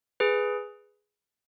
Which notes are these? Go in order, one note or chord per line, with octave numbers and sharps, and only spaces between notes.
G#4 B4